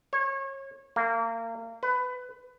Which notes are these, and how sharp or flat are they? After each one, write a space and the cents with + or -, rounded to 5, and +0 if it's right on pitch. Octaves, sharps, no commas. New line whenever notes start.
C#5 -30
A#3 -30
B4 +20